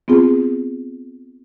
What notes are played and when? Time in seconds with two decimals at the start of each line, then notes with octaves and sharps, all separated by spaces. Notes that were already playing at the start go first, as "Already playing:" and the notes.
0.08 B3 C4 F4 G#4